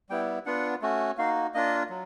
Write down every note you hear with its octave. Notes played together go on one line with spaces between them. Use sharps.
G3 B3 E4 G5
B3 D4 F4 F#5
A3 C#4 F#4
A#3 D#4 F#4 F5
A#3 D4 F4 D#5
F#3